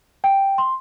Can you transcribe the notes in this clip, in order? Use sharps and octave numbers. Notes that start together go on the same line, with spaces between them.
G5
C6